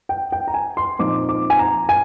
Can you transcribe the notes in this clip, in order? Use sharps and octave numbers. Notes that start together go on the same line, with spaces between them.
G5
G5
A#5
G#5
C6
A#2 F3 C4 D#4 D6
D6
G#5
A#5
G#5